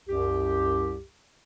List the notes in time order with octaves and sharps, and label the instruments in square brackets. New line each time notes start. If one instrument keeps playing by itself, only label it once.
[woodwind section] C2 F#2 G4